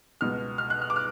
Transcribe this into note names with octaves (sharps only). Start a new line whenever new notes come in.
C#2 B2 F6
F6
F#6
F6
D6
F6